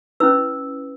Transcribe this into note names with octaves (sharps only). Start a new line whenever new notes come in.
C#4 E4 B4 E6